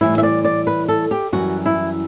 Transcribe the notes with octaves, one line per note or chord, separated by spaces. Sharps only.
A2 E3 G3 E4
E5
D5
D5
B4
A4
G4
F#2 E3 G3 F#4
E4